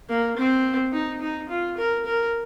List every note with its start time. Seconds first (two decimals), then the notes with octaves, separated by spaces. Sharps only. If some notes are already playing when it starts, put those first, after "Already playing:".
0.09 A#3
0.36 C4
0.92 D#4
1.21 D#4
1.49 F4
1.77 A#4
2.06 A#4